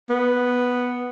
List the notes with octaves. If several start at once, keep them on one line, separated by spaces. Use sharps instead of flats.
B3